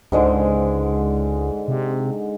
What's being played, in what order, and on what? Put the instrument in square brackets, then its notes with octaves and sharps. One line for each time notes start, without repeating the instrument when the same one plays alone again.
[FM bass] C#2 [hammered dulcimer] G#2 D3 G#3
[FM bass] C3